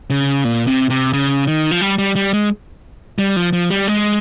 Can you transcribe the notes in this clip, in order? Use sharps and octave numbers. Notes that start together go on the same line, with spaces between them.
C#3
A#2
C3
C3
C#3
D#3
F3
G3
G3
G3
G#3
G3
F3
F3
G3
G#3